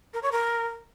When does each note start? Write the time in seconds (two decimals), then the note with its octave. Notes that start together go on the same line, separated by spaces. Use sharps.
0.14 A#4
0.23 C#5
0.32 A#4